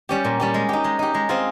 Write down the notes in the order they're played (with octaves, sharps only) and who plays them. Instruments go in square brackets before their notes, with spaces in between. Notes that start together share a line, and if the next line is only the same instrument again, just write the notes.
[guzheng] G3 C#4 G4
A#2
G3 C#4 G4
G#3
D#4 G4
G#3
D#4 G4
G#3
C4 F4 G#4